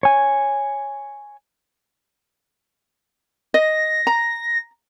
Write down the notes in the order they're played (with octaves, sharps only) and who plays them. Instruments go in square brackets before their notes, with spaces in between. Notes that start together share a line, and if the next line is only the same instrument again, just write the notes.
[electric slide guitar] C#5 G#5
[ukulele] D#5 [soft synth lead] A#6
[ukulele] A#5